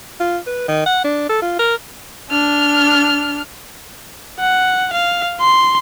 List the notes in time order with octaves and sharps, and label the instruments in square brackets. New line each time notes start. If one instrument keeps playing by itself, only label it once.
[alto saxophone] F4
B4
D#3
F#5
D4
A4
F4
A#4
[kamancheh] D4 F6
[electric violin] F#5
F5
C6